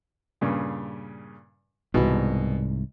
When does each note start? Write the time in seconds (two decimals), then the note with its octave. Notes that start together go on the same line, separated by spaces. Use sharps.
0.41 G2 A#2 C#3
1.94 C2 G#2 B2 E3